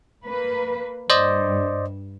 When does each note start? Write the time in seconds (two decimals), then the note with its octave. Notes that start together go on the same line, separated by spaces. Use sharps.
0.24 A#3 B4
1.10 G2 C5 D5 D#5